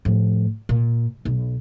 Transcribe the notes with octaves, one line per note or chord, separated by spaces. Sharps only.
A2 F3
A#2
B1